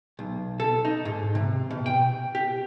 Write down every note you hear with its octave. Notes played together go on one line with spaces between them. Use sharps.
B1
A4
D#4
G#2
C3
B2
G5
G4